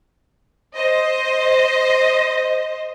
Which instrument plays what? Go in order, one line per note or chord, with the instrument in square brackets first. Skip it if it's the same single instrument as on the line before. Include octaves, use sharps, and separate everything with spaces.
[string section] C5 D#5